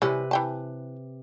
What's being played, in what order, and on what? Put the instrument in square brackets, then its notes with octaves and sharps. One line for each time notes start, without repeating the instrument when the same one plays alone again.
[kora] C3 B4 [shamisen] E3 G3 C#4
[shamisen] E3 G5 A5